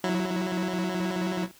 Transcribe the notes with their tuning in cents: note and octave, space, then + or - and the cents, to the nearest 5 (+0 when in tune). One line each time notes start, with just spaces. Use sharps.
F#3 -10 E4 +0